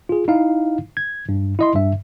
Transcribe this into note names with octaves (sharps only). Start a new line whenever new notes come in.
F4 G#4
D#4 E4 F5
G#6
G2
E4 D#5 C6
G2 E5